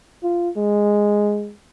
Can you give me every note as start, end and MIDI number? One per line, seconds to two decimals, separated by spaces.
0.23 0.50 65
0.56 1.53 56